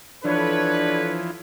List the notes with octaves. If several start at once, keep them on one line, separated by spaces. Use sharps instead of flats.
E3 F3 D4 A4 B4 C#5